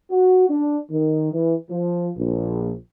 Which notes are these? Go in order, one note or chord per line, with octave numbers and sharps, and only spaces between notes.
F#4
D4
D#3
E3
F3
A#1